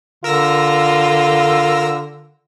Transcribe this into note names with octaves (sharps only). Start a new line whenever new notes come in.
D3 F4 A#4 E6 A#6